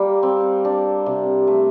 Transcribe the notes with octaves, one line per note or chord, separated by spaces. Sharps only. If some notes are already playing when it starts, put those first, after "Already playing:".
Already playing: G3 A#3
C4
D4
C3
A3